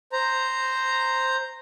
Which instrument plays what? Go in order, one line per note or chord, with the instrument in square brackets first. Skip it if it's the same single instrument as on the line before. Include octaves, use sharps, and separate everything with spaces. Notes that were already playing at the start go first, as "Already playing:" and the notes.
[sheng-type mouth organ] C5 A#5